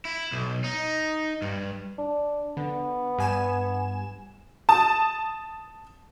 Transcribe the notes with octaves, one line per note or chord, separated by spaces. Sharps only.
E4
B1
D#4
G2
D4
D3 B3
G2 G#5 E7
A5 D#6